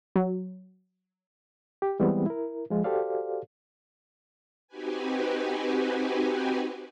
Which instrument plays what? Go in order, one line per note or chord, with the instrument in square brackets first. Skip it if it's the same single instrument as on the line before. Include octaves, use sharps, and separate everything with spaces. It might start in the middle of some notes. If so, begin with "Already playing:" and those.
[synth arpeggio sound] F#3
[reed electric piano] G4
E3 G3 G#3 B3 C4
E4 A#4
F3 G#3 F4
F#4 G4 A4 C5 D5 F5
[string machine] C4 D#4 F#4 G4 B4 G#5